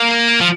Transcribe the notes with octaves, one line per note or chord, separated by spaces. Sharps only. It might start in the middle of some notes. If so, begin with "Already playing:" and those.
Already playing: A#3
F3